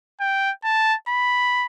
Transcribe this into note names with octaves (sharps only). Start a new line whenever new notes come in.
G5
A5
B5